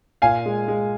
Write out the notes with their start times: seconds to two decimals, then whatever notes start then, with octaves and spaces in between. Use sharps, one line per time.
0.22 A#2 F5 G#5
0.46 G#3
0.68 G#3